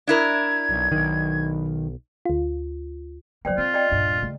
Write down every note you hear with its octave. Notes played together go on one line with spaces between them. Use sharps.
D4 E4 A#4 G#6
B1
B1 D#3
D2 F4
F#3 A#3 C5 D5 G5
C4 F4
D5 D#5 G5
D#1 G2
C#3 A3